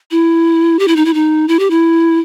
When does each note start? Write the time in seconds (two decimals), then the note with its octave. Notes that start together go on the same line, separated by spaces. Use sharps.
0.11 E4
0.79 G4
0.88 E4
0.96 D#4
1.05 E4
1.14 D#4
1.48 E4
1.59 G4
1.70 E4